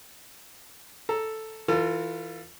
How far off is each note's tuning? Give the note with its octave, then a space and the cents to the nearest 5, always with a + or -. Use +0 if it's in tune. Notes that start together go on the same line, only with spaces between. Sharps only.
A4 +0 A#5 +0
E3 +0 F4 +0 A4 +40